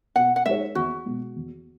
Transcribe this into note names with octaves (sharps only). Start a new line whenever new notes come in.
B2 F#5
F#5
G#3 D#4 G#4 C#5 E5
E2 F#4
B2 G#3
E2